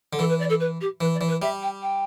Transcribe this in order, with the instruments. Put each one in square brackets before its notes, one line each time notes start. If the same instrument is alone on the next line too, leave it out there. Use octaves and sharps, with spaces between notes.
[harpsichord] D3
[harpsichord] E3 [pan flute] A4
[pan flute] B4
D5
A4
B4
G4
[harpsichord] E3 [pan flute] B4
[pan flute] D5
[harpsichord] E3
[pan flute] B4
[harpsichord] G3 [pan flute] E5
[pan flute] G5
G5